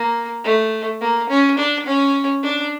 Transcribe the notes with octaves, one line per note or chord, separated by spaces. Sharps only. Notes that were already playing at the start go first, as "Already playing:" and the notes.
Already playing: A#3
A3
A#3
C#4
D4
C#4
D4